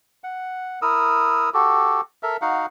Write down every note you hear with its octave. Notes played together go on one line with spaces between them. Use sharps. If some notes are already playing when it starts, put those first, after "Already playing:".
F#5
E4 A#4 D#6 E6
F#4 G4 A4
A4 A#4 E5
D#4 F#4 F5 F#5